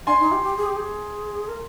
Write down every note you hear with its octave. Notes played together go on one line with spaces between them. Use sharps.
D4 G#5 C6
D#4
G4
G4
G#4
G4
G#4
A#4